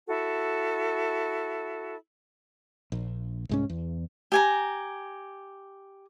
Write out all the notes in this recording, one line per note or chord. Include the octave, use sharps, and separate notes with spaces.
E4 F#4 A4
A#1
C2 G#2 C#4
E2
G4 G#5 A#5